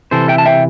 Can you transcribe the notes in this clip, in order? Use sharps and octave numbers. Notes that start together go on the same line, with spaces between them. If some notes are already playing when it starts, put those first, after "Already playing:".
C3 E3 A4 C5
E5 G5
A5
E5 G5